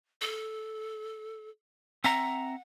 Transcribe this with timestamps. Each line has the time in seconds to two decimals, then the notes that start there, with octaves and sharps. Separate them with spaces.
0.21 A4
2.04 C4 E5 F#5 A#5